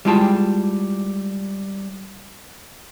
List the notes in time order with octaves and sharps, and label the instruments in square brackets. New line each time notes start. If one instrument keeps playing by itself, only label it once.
[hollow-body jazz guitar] G3 G#3 E4 F4 G5 A5